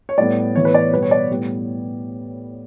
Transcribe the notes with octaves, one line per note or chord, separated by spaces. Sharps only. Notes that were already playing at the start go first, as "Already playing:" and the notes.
C#5
A2 G3 B3 D5
A2 E3 B3 C#5
B4
D5
C#5
B2 G3 B3 B4
C#5
D5
A2 G3 B3